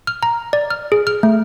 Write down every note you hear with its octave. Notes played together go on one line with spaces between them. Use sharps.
F6
A#5
D5
F6
G#4
F6
A3